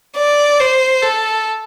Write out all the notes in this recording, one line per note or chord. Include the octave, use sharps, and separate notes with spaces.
D5
C5
A4